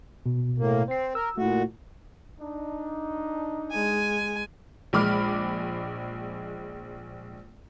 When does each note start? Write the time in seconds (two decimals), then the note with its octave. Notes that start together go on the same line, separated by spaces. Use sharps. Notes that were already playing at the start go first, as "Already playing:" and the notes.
0.26 B2
0.58 A2 A#3
0.88 C4 C5 C7
1.15 A#4 E6
1.38 A#2 A3 E4 F#4
2.40 D4 D#4
3.72 G#3 G#5
4.93 A#1 G#3 B5 D6 F6